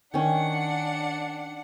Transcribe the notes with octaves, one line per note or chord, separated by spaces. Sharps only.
D#3 C#4 D4 F#5